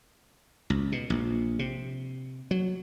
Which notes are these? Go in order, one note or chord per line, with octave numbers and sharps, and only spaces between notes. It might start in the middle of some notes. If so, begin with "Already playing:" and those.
C#2
B2
A#1
C3
F#3